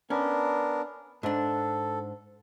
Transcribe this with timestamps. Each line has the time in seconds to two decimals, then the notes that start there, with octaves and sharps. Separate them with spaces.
0.10 B3 C#4 D4 A#4
1.23 G#2 D4 A4